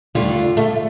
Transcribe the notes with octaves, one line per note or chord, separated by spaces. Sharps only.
D#2 D3 G3 A3 D4 F4
A3